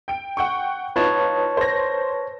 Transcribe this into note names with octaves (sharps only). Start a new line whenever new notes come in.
G5 D7
F#5 G5 C#6
D#4 F4 B4 C#5 A5
C5 A#6